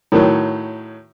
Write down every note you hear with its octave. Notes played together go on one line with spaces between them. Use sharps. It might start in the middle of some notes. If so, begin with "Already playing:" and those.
A2 D#3 F#3